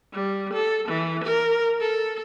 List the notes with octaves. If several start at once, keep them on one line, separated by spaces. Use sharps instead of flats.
G3
A4
E3
A#4
A4